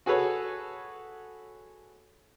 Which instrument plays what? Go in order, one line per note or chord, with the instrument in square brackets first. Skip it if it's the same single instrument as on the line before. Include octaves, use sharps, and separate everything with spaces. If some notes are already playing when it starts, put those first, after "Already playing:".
[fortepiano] F#4 G#4 A4 B4 C#5